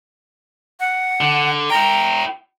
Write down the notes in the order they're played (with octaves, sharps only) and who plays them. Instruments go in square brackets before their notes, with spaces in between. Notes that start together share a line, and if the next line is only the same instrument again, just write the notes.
[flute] F#5
[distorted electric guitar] D3
[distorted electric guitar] E4 G5 [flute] A#5